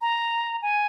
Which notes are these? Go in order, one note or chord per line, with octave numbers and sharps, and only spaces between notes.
A#5
G#5